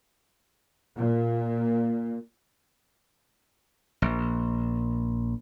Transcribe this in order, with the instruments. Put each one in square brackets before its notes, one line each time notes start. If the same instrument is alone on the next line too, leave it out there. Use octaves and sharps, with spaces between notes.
[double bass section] A#2
[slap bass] A#1